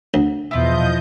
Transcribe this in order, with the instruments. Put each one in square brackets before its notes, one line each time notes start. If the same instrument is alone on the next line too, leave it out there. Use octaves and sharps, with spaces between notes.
[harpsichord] D2
[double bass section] E2 B2 [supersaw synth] F3 D#5 G6 [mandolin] E4 F4